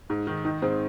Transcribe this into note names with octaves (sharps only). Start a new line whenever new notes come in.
G#2
D#3
D#3 D#4
G#2 C4